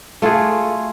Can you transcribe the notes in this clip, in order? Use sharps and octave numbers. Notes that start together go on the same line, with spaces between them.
A3 F4 F#4 G#4